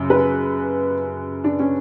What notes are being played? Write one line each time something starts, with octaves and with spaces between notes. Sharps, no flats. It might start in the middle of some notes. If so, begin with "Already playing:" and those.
Already playing: F#2 C#3
B4
D4
C#4